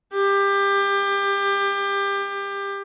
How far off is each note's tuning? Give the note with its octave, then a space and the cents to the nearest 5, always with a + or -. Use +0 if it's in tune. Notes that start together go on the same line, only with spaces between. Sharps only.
G4 +25